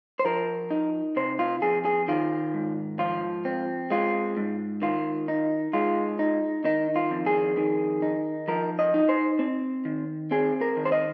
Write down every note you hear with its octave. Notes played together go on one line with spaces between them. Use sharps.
C5
F3 A#4
D#4
C3 C5
F4
F2 G#4
G#4
D#3 F4
G#2
F3 F4
C4
G#3 F4
G#2
D#3 F4
D#4
G#3 F4
D#4
D#3 D#4
F4
F2
G#4
D#3
D#4
F3 A#4
D#5
D#4
C5
C4
D#3
C4 G#4
A#4
D#3
C5
D#5